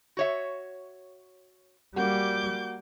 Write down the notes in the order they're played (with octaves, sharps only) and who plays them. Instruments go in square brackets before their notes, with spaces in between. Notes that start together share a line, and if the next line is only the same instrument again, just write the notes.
[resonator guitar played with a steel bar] F#4 C#5 E5
[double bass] G3 [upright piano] A#3 F#4 [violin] D6 G6